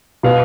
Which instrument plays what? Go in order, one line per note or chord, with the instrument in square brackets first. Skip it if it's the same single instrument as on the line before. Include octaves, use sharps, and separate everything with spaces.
[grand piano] B2 F5